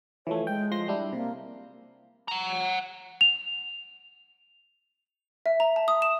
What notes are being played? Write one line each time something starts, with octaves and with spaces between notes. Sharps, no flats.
E3 F3 A3 C#5
G#3 G5
F3 C6 A#6
G3 D4 E4
C3 A#3
F#5 A#5
F7
E5
A#5
A5
D#6
E7